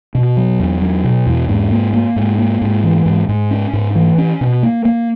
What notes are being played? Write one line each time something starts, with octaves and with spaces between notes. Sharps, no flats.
B2
F#3
E2
F#3
B2
E2
G#2
A#3
A#3
G#2
A#3
G#2
E3
G#2
G#2
C#4
G#2
E3
C#4
B2
A#3
A#3